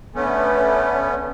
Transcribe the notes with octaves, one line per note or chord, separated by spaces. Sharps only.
D3 A3 B3 C#4